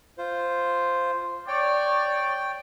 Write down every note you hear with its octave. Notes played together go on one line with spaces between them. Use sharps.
F4 C5
C#5 D5 G5